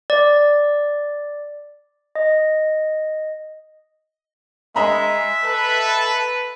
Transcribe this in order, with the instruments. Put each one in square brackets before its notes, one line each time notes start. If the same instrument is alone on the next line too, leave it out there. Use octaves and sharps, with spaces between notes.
[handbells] D5
D#5
[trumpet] G#3 [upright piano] D#5 A#5 B5 [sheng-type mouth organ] E5
[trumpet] A4 [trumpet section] B4